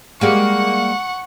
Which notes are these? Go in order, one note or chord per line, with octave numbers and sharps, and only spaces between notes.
G3 G#3 A#3 F#5 C#6